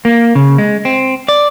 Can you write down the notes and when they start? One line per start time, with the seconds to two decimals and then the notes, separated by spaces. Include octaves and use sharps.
0.05 A#3
0.35 C#3
0.58 G#3
0.85 C4
1.28 D5